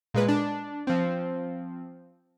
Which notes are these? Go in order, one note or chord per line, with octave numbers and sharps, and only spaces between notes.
A#2 G#3 B4
D4
F3 C4